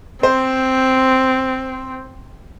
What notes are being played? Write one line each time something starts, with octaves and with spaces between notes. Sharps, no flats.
C4 C5